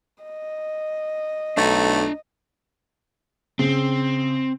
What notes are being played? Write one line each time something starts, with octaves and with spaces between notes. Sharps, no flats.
D#5
B1 A3 D4 A#5
C#3 C4